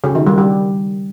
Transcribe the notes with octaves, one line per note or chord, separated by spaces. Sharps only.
C#3
D#3
G3
G3